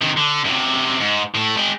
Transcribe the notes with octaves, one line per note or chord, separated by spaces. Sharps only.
C3 D#3
D3
F#2 C3
G#2
A2 A3
G#3 G5